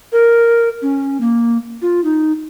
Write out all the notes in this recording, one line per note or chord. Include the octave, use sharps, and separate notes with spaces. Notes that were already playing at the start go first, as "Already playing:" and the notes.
A#4
C#4
A#3
F4
D#4